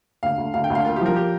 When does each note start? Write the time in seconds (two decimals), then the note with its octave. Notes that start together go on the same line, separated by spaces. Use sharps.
0.23 D2 F5
0.38 D2
0.54 D2 F5
0.64 G5
0.70 D2
0.75 F5
0.85 A#3 F4
0.96 G4
1.01 F3 A#4
1.16 G4